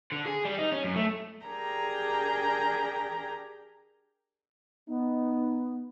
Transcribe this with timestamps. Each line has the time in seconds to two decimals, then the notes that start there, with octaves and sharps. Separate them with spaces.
0.12 D3
0.26 G#4
0.45 G3
0.58 D#4
0.72 C#4
0.84 F#2
0.96 A3
1.46 D4 G4 G#4 A#4 G5 A#5
4.88 B3 D#4